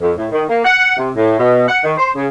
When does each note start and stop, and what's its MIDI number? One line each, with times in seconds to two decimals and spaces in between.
0.01 0.12 41
0.17 0.27 45
0.32 0.43 51
0.49 0.62 58
0.65 0.92 78
0.97 1.11 48
1.16 1.37 45
1.39 1.68 47
1.68 1.80 78
1.84 1.93 51
1.98 2.10 72
2.15 2.28 49